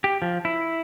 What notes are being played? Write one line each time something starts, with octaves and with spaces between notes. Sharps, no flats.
G4
F3
E4